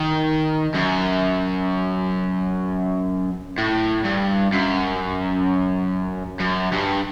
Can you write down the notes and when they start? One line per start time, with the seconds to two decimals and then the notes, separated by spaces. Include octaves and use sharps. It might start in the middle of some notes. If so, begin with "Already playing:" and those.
Already playing: D#3
0.75 F#2
3.58 A2
4.04 G2
4.52 F#2
6.40 F#2
6.73 G2